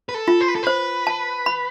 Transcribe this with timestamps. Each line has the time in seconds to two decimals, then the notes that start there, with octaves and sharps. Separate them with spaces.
0.09 B4
0.14 A4
0.28 F4
0.41 C5
0.48 B4
0.56 A4
0.63 B4 C5
1.07 A5
1.46 B5